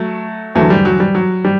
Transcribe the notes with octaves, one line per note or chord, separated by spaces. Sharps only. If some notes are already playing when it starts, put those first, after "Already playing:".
Already playing: F#3 A3
E2 D3 F#3 A3
G3
F#3
G3
F#3
G3